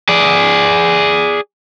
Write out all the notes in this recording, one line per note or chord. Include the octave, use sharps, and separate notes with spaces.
G#4 D5